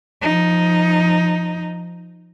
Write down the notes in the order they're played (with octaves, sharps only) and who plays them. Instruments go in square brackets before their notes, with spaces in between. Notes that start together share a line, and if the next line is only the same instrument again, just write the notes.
[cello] F3 D#4